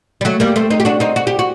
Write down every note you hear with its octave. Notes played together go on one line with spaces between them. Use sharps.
G3
F#3 A3
G3 A#3
A3 C4
C4 D#4
G4
D4 F#4
C4 D#4
F#4
G4
F#4